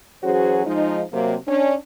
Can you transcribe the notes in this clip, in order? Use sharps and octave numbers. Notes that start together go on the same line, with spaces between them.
E3 F#3 C#4 F#4 G#4 C5
F3 G#3 D#4
C3 F#3 A#3
C#4 D4